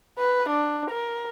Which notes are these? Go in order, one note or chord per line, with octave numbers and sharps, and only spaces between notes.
B4
D4
A#4